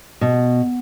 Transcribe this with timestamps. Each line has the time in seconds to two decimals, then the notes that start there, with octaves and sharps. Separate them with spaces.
0.21 B2